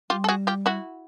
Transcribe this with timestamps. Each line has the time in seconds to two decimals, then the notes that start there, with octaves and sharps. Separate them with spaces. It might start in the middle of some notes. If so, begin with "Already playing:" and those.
0.10 G3 F4 G4
0.24 A4
0.29 F#4 G#4
0.47 F4 G4
0.66 E4 F#4